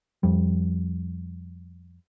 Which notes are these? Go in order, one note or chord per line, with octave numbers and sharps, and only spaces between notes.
F2 G3